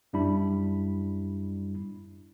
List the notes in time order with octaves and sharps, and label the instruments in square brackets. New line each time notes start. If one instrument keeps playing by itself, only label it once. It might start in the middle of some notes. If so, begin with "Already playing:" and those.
[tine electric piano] F#2 G3 D4 E4 B5